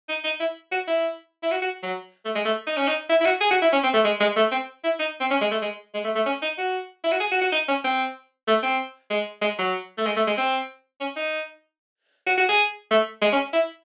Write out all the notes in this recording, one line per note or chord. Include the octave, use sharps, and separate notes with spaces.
D#4
D#4
E4
F#4
E4
E4
F#4
F#4
F#3
A3
G#3
A3
D#4
C#4
D#4
E4
E4
F#4
G#4
F#4
E4
C#4
C4
A3
G#3
G#3
A3
C4
E4
D#4
C4
C#4
G#3
A3
G#3
G#3
A3
A3
C#4
D#4
F#4
E4
F#4
G#4
F#4
F#4
D#4
C#4
C4
A3
C4
G#3
G#3
F#3
A3
G#3
A3
G#3
C4
C#4
D#4
F#4
F#4
G#4
A3
G#3
C#4
E4